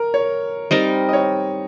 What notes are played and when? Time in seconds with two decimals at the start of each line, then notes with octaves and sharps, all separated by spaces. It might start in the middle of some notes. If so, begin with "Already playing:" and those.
Already playing: A#4
0.14 C#5
0.71 G3 C4 D#4 A#4 D#5
1.09 D#5
1.13 C#5